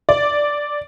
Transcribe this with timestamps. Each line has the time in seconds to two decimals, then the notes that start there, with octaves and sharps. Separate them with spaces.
0.09 D5